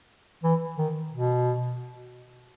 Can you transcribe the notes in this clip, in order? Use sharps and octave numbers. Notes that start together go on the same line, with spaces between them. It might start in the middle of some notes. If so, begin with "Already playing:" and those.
E3
D#3
B2